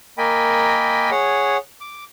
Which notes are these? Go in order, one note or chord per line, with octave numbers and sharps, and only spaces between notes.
A#3 A#4 D#5 G5 G#5 B5
G#4 C#5 F#5
D6